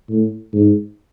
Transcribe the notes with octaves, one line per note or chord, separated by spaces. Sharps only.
A2
G#2